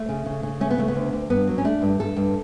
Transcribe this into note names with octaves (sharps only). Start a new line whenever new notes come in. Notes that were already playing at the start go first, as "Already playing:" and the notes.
Already playing: A3
C#3
C#3
C#3
A3 C#4
B3
C#3 A3
B3
D2
D2
G2 B3
F#3
C#4
A3 D4
G2
G2 A4
G2